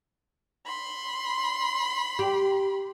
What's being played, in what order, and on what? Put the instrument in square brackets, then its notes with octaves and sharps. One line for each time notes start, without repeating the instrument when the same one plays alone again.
[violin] B5 C6
[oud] G4